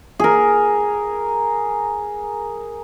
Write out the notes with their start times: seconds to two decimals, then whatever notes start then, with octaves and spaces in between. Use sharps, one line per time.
0.20 G#4 A#4